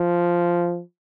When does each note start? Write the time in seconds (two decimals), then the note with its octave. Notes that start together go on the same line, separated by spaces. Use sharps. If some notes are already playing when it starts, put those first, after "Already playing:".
Already playing: F3